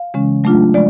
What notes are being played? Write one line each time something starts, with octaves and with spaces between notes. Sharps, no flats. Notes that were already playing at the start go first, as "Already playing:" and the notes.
Already playing: F5
C#3 E3 G#3 C#4
F#3 A3 D4 F4
F3 G#3 D5